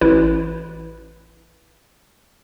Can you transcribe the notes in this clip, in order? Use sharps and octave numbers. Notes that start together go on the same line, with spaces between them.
A1 E4 B4